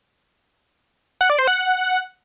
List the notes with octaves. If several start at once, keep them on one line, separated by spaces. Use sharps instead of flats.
F#5
D5
C5
F#5